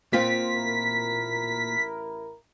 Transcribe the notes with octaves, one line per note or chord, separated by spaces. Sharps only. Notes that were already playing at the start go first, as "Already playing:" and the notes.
A#2 C4 F4 B6
A1 E4 A#4